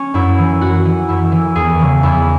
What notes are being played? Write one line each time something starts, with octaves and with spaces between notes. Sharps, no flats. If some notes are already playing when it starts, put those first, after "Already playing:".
Already playing: C#4
F#2 E4
E3
F#2 F#4
E3
F#2 E4
E3
E2 G#4
C#3 E3
E2 E4